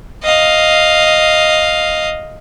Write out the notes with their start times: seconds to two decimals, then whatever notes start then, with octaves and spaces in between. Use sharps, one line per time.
0.23 D#5 F5